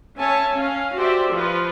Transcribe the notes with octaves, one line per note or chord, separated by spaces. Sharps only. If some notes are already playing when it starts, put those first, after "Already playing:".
C#4 C#5 E5 G#5 A5
C#4 F5
F#4 G4 C5 D5 E5
F3 F4 B4